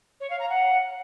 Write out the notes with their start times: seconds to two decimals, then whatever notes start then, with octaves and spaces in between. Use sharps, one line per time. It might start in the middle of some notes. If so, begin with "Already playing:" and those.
0.20 C#5
0.30 F5
0.39 A#5
0.49 F#5